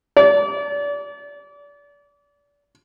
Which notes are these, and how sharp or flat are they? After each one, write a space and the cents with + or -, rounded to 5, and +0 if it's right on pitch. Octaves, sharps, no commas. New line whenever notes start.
D5 -30